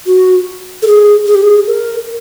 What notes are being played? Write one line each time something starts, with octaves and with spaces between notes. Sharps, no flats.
F#4
A4
G#4
G#4
G4
G#4
A#4